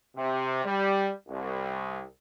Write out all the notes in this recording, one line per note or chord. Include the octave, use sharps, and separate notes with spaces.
C3
G3
C2